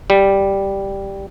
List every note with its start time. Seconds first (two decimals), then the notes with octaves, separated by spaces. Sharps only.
0.10 G3